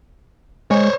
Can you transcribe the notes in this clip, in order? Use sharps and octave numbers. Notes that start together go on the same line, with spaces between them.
G#3 C5 C#5